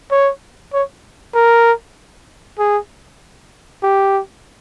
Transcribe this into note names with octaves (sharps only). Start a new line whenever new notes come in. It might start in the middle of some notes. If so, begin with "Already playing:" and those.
C#5
C#5
A#4
G#4
G4